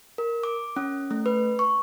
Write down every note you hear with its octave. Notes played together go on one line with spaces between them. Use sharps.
A#4
D6
C#4
A3
B4
C#6